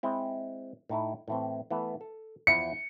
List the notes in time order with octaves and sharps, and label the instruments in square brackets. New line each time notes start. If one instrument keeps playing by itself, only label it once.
[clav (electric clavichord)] G#3 C4 E4
A2 D#4 E4
A2 E3 C4
E3 A3 B3
A4
[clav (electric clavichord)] E2 F3 E4 [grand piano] C#7